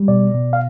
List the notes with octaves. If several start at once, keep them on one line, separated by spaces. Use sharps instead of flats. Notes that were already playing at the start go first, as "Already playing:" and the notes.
Already playing: G3
B2 D5
B2
F5